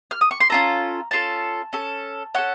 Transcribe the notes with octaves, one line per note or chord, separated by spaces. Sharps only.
F6
D#6
C#6
C6
C#4 F4 A4 A#5
C#4 F4 A4 A5
C#4 A4
C#4 A4 F#5